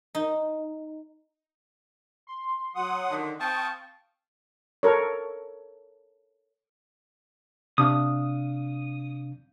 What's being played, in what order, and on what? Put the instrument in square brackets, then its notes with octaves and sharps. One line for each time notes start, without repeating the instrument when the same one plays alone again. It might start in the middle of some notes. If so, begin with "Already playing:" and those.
[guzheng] D#4
[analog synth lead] C6
[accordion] F#3 F#5 D#6
[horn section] D3 D#3
[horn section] C4 F5 A5 [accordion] G5 C#6 D#6
[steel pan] A4 A#4 C#5
[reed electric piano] C3 D4 F5 [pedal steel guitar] D#6